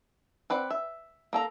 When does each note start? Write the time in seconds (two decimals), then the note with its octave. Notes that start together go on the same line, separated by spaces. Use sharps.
0.50 C4 B4 D5 F#5
0.71 E5
1.33 A#3 A4 A#5